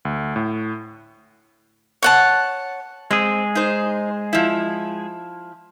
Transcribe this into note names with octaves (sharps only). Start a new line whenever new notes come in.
D2
A2
C#5 F#5 A5
G#3 C4 G#4
D#4 C5
F3 E4